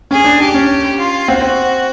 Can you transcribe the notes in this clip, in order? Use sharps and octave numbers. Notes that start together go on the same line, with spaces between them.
C#4 G#4
D4
D4 G4
C#4
F4
C4 F#4
C4